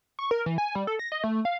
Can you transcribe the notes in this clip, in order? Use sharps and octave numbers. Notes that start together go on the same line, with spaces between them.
C#6
A#4
E3
G#5
G3
A4
A#6
D#5
A3
F5